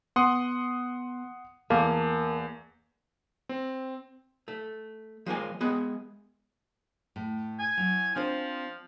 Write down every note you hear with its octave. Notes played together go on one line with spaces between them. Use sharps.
B3 F#5 C6 D#6
E2 A#3 A#4 A5
C4
A3
F3 G#3 A#3 G#5
G#3 B3 G#4
A2
G#5
F#3 E4
F3 C4 D4 C5